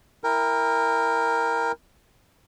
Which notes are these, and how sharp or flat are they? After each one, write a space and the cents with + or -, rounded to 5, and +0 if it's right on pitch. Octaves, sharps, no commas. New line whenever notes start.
E4 +0 A#4 +0 G5 +35